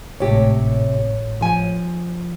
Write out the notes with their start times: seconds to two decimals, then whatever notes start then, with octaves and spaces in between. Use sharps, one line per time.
0.20 G#1 A2 C3 G4 C#5
1.41 F3 G#5